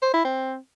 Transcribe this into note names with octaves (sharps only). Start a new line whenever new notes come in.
C5
E4
C4